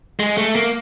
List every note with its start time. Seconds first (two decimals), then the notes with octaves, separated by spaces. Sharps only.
0.20 G#3
0.38 A3
0.56 A#3